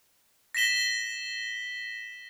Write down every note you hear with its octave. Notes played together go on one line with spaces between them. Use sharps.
A#6 B6 E7 G7